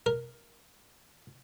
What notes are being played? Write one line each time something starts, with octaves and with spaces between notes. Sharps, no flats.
A#4